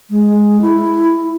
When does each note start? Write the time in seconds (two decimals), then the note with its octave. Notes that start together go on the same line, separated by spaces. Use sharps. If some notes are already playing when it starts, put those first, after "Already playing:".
0.10 G#3
0.62 E4